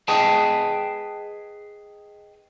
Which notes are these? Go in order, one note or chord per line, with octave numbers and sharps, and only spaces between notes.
G#4 B4 D#5 G5 A5